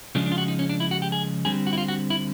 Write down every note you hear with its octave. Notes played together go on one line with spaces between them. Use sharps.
C#3 F3 G#3 D4
D4
F4
F#4
D#4
C#4
D4
E4
F#4
G4
G#4
D3 G3 C4 G#4
F#4
E4
F4
F#4
E4